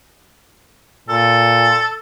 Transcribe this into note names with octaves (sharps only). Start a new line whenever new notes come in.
A#2 A4